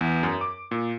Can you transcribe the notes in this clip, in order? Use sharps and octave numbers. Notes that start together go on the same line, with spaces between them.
E2
F#2
D6
A#2